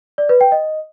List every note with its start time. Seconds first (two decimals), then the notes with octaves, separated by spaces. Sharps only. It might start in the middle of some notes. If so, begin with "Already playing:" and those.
0.18 D5
0.29 B4
0.41 G5
0.52 D#5